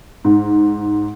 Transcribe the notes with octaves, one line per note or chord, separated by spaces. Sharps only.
G#2